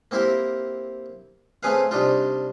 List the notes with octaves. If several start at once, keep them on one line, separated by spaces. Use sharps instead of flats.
A#3 C4 E4 G4 A#4
A3 C4 C#4 G#4 B4 F5
C3 G3 D4 D#4 F4